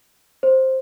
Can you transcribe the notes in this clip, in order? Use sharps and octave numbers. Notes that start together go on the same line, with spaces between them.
C5